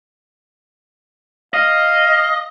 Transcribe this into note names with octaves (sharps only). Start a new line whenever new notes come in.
D#5 F5